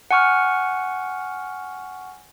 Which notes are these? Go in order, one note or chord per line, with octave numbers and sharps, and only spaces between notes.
F#5 G#5 C#6 F6